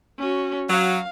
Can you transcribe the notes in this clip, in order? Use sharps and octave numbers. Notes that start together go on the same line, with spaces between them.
C#4 F#4
F#3 F5